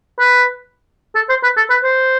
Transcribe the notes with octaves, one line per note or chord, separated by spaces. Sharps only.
B4
A4
C5
B4
A4
B4
C5